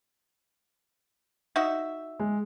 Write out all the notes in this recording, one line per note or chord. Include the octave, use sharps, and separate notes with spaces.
D#4 F#4 E5
G#3